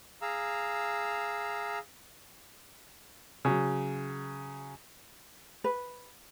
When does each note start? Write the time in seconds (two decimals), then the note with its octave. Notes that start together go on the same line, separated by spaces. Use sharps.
0.22 G#4 F5 A#5 E6
3.45 C#3 F#3
5.64 B4